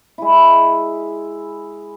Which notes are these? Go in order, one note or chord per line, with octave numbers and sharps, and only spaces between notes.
G#3 E4